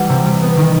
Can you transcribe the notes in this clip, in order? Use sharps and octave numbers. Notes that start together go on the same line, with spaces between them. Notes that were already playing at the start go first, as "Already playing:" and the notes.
Already playing: E3 G3 F#5
C3
G3
B3
D#3